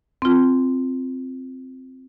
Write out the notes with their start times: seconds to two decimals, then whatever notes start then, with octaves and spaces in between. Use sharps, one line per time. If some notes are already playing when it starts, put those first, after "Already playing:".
0.22 C4 F4